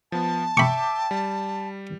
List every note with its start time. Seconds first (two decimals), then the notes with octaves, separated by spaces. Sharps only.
0.12 F3 B3 A5
0.57 E5 G5 B5 C#6 D6
1.11 G3